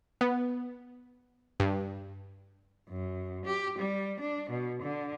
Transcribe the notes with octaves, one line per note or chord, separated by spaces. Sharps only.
B3
G2
F#2
G4
G3
D4
B2
D3